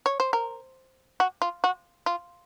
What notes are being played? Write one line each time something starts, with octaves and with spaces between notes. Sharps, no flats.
C#5
C5
A#4
F#4
F4
F#4
F4